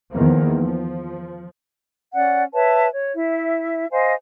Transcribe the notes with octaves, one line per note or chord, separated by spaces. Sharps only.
E2 D#3 F3 A#3
F3
C#4 D5 F#5
B4 C#5 E5 A5
C#5
E4 E5
C5 D#5 F5 G#5